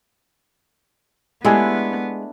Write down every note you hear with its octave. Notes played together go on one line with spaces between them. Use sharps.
G#3 A3 B3 D4 E4 G4 G#5